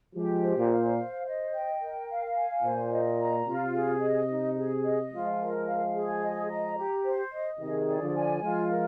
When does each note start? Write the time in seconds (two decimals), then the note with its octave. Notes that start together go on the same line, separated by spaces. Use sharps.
0.15 F3 G#3 G4
0.43 C5
0.57 A#2
0.71 F5
0.98 C5
1.26 D#5
1.53 G5
1.81 A#4
2.08 F5
2.36 G#5
2.63 A#2 C5
2.92 D#5
3.19 A#5
3.47 C3 F4
3.74 G#4
4.02 D#5
4.29 D#4
4.56 G#4
4.84 D#5
5.12 F3 G#3 F4
5.39 A#4
5.67 F5
5.95 G#4
6.22 D#5
6.50 A#5
6.78 G4
7.05 C5
7.32 D#5
7.60 C3 D#3 G#4
7.87 D5
8.01 D3 F3
8.15 G#5
8.43 F3 G#3 F4
8.71 A#4